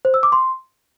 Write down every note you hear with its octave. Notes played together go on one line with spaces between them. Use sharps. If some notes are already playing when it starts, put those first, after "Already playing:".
C5
E6
D6
C6